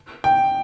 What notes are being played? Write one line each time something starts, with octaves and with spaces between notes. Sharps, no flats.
G5